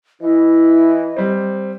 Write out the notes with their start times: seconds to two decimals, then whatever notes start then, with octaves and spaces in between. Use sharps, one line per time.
0.21 E3 E4 D#5
1.17 G3 C4